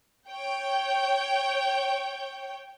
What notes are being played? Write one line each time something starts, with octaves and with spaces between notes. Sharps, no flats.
C#5 G5